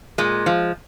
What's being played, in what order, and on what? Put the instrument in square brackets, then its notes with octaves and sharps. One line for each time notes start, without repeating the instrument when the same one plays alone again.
[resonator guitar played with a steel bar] A#2 G#3
F3